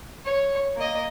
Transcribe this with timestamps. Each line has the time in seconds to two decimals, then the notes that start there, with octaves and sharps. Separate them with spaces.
0.25 C#5
0.76 A#3 D#5